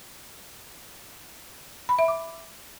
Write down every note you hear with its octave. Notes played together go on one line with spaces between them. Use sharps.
B5
E5
D6